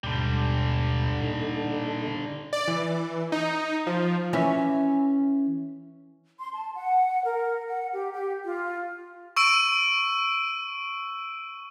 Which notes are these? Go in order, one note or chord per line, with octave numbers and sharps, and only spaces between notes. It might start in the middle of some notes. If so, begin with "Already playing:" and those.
D#2 G#2 B2 D3 G3
A#2 D#4 A4
D5
E3
D#4
F3
E3 C#4 E5
C6
A5
F#5
A#4
F#5
G4
G4
F4
C#6 E6 D7 D#7